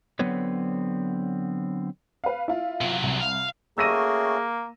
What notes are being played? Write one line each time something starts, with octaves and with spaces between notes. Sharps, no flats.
D3 F#3 B3 C4 B4 C#5
B4 F5
E4 F4
C3 F#3
C2
F5
A3 A#3 C#4 F#4 G#4 E6 A#6 D#7